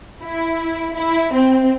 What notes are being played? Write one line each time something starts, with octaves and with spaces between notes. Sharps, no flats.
E4
E4
C4